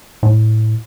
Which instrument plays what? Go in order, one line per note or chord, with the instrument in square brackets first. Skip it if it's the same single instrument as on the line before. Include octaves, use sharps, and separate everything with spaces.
[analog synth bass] A2